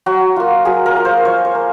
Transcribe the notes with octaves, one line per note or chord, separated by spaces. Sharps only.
F#3 F#4
A#3 F4
F#3 G#4
A#4
A#3 F4
C5
F3 C#5
C5
A#3